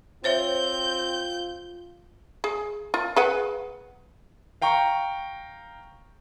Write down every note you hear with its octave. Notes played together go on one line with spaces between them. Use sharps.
C4 F4 C5 C#5 E5 G6
G#4
F4
G#4 B4 F#5
F5 G5 A#5 C#6